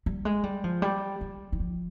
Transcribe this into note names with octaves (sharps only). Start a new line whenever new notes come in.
G3
G#3
G3
F3
G3
G3
D#3
F3